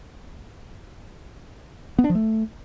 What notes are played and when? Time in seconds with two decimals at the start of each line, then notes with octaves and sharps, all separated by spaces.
1.98 B3
2.04 D4
2.10 F3
2.15 A3